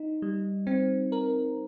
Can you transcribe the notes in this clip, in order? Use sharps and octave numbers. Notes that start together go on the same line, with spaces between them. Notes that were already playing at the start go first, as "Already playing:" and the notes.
Already playing: D#4
G3
C4
A#4